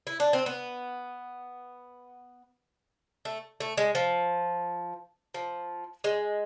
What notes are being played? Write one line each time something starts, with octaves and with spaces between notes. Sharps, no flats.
E4
D4
C4
B3
A3
A3
G#3
F3
F3
G#3